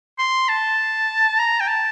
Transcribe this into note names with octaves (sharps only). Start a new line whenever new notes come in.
C6
A5
A#5
G5
A5